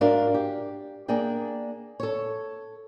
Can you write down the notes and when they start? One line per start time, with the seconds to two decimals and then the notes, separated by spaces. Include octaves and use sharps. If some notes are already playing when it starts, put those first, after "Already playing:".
0.01 G#2 D4 F#4 A#4 F5
0.34 G4
1.08 A#3 D4 G#4 G5
2.00 A4 C#5